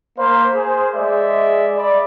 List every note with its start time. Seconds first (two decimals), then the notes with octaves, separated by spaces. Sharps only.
0.19 A#3 C5 F5 B5
0.55 G#4 C5
0.94 G#3 G#4 D5 E5
1.76 D5 B5